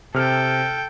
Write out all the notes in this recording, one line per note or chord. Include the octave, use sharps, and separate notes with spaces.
C3 A4 G5 F6